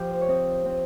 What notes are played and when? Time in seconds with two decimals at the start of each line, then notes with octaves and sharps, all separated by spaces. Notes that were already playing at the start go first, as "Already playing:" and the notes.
Already playing: F3 F4 G4
0.11 C5
0.22 C#5
0.28 C4 D#5
0.66 C4